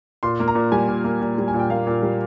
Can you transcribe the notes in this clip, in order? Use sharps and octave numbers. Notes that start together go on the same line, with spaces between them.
A#2 C6
A#3
A#5
A#2
G3 G#5
A#2
A#3
A#2
G3
G#5
A#2
G5
A#3 F5
A#2
G3